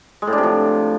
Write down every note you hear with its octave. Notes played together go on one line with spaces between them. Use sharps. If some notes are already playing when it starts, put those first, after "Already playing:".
G#3
A2
D4
C3
F3